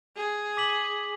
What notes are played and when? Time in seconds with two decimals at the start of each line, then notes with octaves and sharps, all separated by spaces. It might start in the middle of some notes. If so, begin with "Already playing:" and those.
0.16 G#4
0.57 D6 B6 F#7